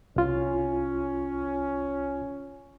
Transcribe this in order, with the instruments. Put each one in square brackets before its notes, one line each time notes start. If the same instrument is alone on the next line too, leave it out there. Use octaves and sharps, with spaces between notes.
[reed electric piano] C2 F4 [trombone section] C#4